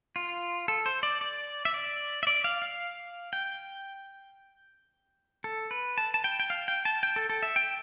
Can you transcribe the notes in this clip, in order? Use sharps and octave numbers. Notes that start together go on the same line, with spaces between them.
F4
A4
C5
D5
D5
E5
D5
E5
D5
F5
F5
G5
A4
B4
A5
A5
G5
G5
F5
G5
A5
G5
A4
A4
E5
G5